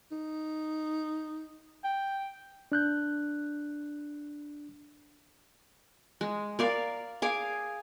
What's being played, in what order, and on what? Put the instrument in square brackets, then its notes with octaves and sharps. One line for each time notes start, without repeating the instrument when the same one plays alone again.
[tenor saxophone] D#4
[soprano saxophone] G5
[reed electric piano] D4 F#6 G6
[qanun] G#3
A#4 D5 F5
G#4 F5 D6